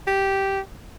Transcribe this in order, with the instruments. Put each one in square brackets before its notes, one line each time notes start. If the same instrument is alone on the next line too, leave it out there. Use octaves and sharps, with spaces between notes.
[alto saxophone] G4